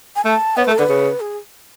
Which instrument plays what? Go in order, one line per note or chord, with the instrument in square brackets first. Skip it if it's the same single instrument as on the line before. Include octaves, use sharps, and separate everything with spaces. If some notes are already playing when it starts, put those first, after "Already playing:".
[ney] G#5
[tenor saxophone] A3 [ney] A5
[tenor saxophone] B3 [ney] C#5
[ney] B4
[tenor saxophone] A3
[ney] A4
[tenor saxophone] D3 [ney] B4
[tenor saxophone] C#3
[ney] G#4